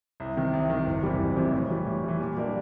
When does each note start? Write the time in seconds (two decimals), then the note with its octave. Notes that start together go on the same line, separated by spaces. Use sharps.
0.20 C2
0.37 C3 D#3
0.53 C2
0.70 C3 D#3
0.87 F#1
1.03 F2 C3 E3 G3
1.20 F#1
1.36 F2 C3 E3 G3
1.52 A2
1.70 E3 G3
1.86 A2
2.04 E3 G3
2.20 A#2
2.37 G3 A#3 D4